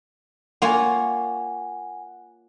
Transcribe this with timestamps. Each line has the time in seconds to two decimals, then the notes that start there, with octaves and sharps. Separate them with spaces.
0.62 A#3 F4 C#5 F#5 G#5